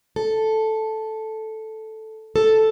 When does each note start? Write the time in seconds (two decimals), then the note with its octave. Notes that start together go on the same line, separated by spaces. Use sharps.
0.16 A4
2.36 A4